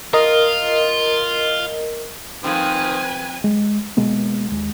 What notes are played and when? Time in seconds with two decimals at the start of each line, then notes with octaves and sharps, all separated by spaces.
0.13 F4 A#4 D#5
2.44 D#3 F3 C4 B4 C5 G#5
3.44 G#3
3.97 B2 G#3 A#3 B3
4.48 D#2 G#3